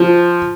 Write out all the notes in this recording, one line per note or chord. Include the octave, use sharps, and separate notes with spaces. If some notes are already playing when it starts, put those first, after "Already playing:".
Already playing: F3